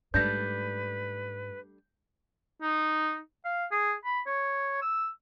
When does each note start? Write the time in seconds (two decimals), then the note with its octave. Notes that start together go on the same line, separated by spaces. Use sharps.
0.14 G#2 G3 A3 D4 B4 G6 A#6
2.62 D#4
3.45 F5
3.71 G#4
4.05 B5
4.27 C#5
4.82 E6